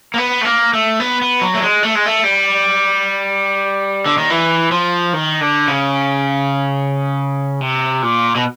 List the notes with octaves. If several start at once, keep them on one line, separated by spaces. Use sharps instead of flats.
A#3
B3
A3
A#3
A3
B3
B3
F#3
A3
G#3
A3
G#3
A3
G3
D3
D#3
E3
F3
D#3
D3
C#3
C3
A#2
B2